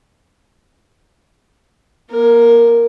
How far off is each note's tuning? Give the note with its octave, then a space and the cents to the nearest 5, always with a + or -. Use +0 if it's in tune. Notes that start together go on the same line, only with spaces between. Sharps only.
A#3 +30 A#4 +0